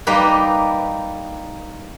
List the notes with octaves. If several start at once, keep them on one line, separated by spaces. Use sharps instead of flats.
G3 A#3 D#4 G4 B4